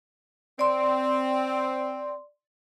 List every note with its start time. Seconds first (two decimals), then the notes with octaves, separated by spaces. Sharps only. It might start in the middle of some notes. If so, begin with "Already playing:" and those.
0.59 C4 D5 C6